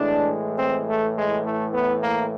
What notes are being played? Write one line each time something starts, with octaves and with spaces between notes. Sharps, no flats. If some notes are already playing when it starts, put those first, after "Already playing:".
Already playing: A2 E3 G#3 D4
C4
A3
G#3
A3
B3
A#3